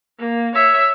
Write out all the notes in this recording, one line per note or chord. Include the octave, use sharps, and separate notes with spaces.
A#3
C#5 E5